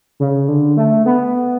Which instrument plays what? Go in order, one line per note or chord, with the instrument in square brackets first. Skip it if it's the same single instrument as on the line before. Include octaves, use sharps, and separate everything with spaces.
[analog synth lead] C#3
D3
A3
B3